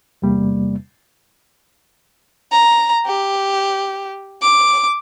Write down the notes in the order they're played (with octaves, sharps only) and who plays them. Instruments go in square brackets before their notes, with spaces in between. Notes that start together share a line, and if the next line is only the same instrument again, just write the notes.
[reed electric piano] E2 C3 G3 A#3
[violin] A#5
G4
D6